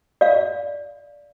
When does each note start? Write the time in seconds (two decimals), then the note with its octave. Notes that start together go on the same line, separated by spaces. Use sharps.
0.21 D5 F5